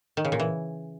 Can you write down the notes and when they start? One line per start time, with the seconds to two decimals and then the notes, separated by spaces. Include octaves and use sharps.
0.17 D#3
0.25 C#3
0.32 A#2
0.40 E3